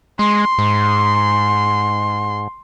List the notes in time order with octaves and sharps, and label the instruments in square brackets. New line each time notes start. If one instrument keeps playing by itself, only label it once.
[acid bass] G#3 [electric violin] C6
[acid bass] G#2